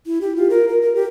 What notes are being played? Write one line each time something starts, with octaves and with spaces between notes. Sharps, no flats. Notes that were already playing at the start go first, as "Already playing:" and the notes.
E4
G4
F4
A#4
A#4
A#4
G4